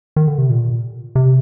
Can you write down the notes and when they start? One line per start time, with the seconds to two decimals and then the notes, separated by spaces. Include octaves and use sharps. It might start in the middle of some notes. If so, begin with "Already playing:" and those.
0.16 D#3
0.27 D3
0.38 C3
0.50 A#2
1.15 C3